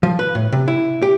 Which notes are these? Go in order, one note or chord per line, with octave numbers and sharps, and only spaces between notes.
F3
B4
A2
C3
E4
G4